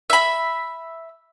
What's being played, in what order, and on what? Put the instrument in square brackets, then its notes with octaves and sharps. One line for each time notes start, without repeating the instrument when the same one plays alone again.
[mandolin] E5 B5